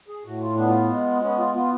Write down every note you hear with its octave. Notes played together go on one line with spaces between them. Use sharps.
G#4
A2 F#4
F4
B3 D4
F4
G#3
B3 C#4
F4
B3 F4